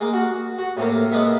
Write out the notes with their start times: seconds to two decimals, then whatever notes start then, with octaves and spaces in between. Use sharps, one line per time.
0.01 G#3 A#3
0.13 F#4
0.58 F#4
0.77 A2 C3 A#3
1.12 G#3 A#3 B3 E5